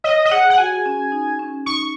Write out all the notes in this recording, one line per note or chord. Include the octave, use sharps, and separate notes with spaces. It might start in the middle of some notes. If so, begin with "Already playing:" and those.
C#5 D#5
D#5
G#4 F#5
F#5
F#4 G#5
G#4
F#4
C#4
D#4
C#4
D#4 C#6